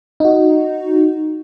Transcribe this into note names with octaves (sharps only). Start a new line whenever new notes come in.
D#4 F#4